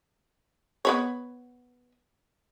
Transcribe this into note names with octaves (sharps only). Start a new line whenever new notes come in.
B3 B4 C#5